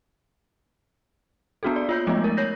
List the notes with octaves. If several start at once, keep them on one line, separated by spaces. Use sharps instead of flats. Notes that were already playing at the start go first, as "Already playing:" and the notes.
A#3 B3 D4 F#4 G#4 A4
D5
F4 C#5 G6
F3 G#3 A3 B3 D#4 D#5
A#4
C#5 G6 A#6